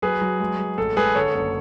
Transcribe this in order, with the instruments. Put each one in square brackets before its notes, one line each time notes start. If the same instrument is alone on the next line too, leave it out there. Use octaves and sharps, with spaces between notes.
[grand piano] F#3 G#4 B4
F#3
G#3
G#3
A1 A4
G#3 G#4 B4
D3 A4 C#5
F#1